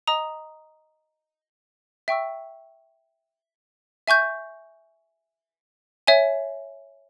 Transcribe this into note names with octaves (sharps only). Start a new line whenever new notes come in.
D#5 A#5 D#6
E5 G5 C#6 E6
E5 G#5 C#6 G6
C#5 E5 G#5